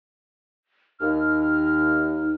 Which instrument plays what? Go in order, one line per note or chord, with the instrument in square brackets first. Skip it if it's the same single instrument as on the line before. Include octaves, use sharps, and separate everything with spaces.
[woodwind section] D#2 F6 [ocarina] D#4